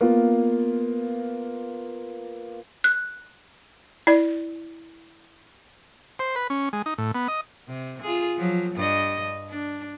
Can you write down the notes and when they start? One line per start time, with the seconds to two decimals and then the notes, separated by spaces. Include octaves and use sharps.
0.01 A#3 B3 F4
2.84 F#6
4.07 E4 D5
6.19 C5
6.36 B4
6.50 C#4
6.73 G#3
6.86 D#4
6.98 A2
7.15 B3
7.28 D#5
7.67 C3
8.02 F4 G#4
8.37 F3 F#3
8.75 G2 D#5
9.50 D4